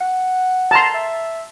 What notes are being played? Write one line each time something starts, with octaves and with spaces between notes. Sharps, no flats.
F#5
A5 A#5 C6
E5